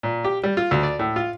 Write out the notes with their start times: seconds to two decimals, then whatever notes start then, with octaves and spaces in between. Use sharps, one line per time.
0.03 A#2
0.24 G4
0.44 G3
0.57 F4
0.71 D2
0.83 D5
0.99 A2
1.16 F4